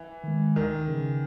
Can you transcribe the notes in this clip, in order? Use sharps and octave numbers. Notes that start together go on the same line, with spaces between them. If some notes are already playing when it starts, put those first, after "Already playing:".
Already playing: E3
D#3 G#3
D2 D#3
C#3 E3